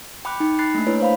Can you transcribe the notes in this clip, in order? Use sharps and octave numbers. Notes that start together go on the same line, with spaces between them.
G5 B5 D6 F#6
D#4 G5
B5 F#6 A6 C7
A3 A#3 D4
E4 B4 C#5
C5 F5 B5